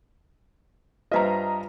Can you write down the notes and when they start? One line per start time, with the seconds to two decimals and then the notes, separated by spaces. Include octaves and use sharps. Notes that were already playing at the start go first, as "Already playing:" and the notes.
1.12 G2 F4 B4 C5 D#5 E5 A#5